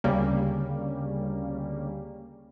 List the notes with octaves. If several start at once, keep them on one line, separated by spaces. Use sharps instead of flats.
D2 C#3 G3 A#3